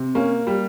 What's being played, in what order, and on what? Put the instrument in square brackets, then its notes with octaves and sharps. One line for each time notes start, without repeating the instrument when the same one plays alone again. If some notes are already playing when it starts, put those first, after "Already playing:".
Already playing: [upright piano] C3
A#3 C#4
G3